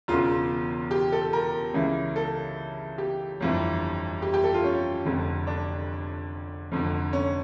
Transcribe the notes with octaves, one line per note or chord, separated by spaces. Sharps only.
E1 E2 C#3 F4
G4
A4
A#4
C#2 C#3 E3
A4
G4
G1 F2 E3
G4
G4
A4
F4
C#4
F1 F2 D3
D4
F1 F2 D3
C#4